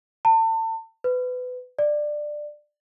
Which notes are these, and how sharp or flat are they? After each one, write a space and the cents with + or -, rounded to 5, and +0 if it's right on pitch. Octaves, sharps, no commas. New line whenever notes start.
A5 +35
B4 +25
D5 +15